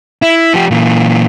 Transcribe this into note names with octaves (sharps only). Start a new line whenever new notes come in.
E4
F3 G4
A#2 E3